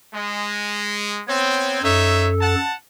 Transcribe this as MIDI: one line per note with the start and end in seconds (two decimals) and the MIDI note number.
0.13 1.21 56
1.28 1.81 59
1.28 1.81 60
1.28 1.79 73
1.83 2.55 42
1.83 2.29 63
1.83 2.55 69
1.83 2.29 73
1.83 2.29 76
2.41 2.74 78
2.41 2.74 81